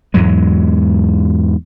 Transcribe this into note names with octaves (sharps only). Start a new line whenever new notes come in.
E2 G#2 F#3 G#3